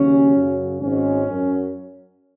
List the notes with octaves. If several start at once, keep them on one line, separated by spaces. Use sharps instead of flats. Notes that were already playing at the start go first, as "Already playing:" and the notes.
Already playing: D#2 C#3 F#3 C#4
F#2 C#3 F#3
G#1 G#2 G#3 C#4
F#2 F#3